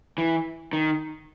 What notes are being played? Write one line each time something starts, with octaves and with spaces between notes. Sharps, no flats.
E3
D#3